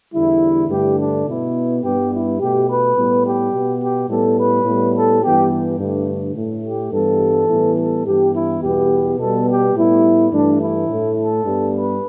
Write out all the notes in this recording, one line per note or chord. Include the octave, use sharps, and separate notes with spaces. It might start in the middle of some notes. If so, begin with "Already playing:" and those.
E2 D3 G3 E4
G2 D3 A3 G4
D4
B2 B3 E4
G2 G3 B3 G4
E4
B2 A3 G4
B4
A2 G3 B3
G4
B2 B3
G4
A2 G3 B3 A4
B4
A2 G3 B3
A4
G2 E3 B3 G4
G2 D3 A3
A2 A3
G4
G2 E3 G3 B3 A4
A2 E3 G3 B3
A4
G2 E3 B3 G4
E4
E2 B2 G3 B3 G4
B2 G3 B3 A4
G4
A2 G3 B3 E4
G2 E3 A3 D4
E4
A2 A3
A4
G2 G3 B3
B4